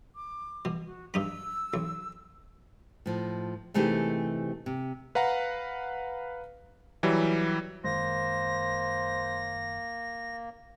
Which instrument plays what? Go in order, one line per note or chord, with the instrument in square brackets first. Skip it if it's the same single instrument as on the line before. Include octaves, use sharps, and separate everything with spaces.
[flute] D6
[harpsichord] B2
[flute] F#4
[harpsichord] G2 D#4 B5 [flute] E6
[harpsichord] B1
[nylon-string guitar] A2 F3
C3 E3 A3 D#4 G4 G#4
C3
[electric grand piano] B4 F5 F#5 A#5
E3 F#3 G3
[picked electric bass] F#2 D#3 G#3 [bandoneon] A#3 [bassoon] C5 [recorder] A#6